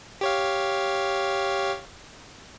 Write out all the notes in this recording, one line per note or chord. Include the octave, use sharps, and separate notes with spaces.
G4 C#5 F5